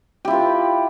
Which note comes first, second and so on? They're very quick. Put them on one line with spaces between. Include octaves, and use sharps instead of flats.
G4 E4 F4 B4